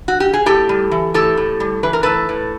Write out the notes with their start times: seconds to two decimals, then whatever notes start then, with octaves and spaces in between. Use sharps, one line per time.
0.08 F#4
0.20 G4
0.33 G#4
0.46 A2 G4 A4
0.69 G3
0.91 E3
1.14 A2 G4 A4
1.37 A2
1.60 G3
1.83 E3 B4
1.93 A#4
2.03 A2 A4 B4
2.29 A2